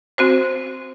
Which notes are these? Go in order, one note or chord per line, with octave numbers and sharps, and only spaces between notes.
C4 F#4 C5